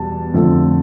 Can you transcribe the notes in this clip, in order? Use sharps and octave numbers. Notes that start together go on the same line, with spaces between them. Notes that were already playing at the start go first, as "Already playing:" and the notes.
Already playing: E2 B2 G3 A5
F2 D3 F3 A3